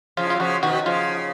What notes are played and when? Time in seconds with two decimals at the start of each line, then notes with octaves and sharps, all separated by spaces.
0.17 C#3 F3 F4
0.30 F#3 F4
0.40 C#3 F3 F#4
0.63 B2 D#3 F#4
0.86 C#3 F3 F4